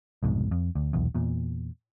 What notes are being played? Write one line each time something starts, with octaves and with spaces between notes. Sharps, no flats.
C2 F2 G#2 B2
F2
D2
D#1 B1 E2
E2 A#2